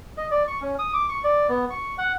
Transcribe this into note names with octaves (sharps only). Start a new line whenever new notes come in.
D#5
D5
C#6
C#4
D#6
D6
C#6
D5
B3
C#6
F#5